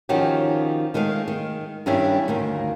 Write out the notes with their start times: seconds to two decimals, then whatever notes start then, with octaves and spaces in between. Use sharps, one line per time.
0.09 D#3 F3 C#4 D#4 F#4 G4
0.94 D#3 G#3 A3 A#4 F5
1.28 D#3
1.86 G2 D#3 G3 C#4 D4 E4
2.28 D2 D#3 A#3